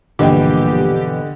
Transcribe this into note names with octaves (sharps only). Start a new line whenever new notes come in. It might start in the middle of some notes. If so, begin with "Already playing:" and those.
A#1 G2 B2 D3 E3 G4 D#5 G5